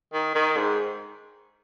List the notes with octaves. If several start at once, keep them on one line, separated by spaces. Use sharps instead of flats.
D#3
D#3
G#2